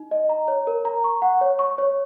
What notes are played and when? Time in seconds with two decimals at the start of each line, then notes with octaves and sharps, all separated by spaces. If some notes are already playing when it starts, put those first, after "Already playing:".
Already playing: D#4
0.11 D#5
0.29 A#5
0.48 C#5
0.67 A#4
0.85 A#5
1.04 C#6
1.22 F#5
1.41 C#5
1.59 C#6
1.78 C#5